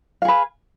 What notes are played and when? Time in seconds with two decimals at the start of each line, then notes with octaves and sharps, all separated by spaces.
0.22 F5
0.25 G#4
0.28 B4